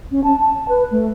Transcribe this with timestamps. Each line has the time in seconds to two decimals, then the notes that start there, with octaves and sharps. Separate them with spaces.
0.11 C#4
0.24 A5
0.40 A5
0.68 B4
0.91 A3